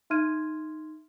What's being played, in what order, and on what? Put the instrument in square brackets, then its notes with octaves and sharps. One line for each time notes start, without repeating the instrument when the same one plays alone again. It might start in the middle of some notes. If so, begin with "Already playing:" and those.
[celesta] D#4 E5 C6 F6 G#6 D#7